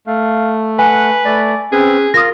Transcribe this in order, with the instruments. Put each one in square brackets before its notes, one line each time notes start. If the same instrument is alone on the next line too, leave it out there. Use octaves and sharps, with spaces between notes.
[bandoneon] A3 [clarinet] F5
[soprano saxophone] B4 [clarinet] F#5 [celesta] G#5
[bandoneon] A3 [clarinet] D5
[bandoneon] C4 B4 [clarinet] C#4 [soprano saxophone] G#4
[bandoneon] F4 [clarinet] A#4 [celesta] D#6 A#6